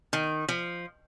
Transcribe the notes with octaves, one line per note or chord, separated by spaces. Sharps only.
D#3
F3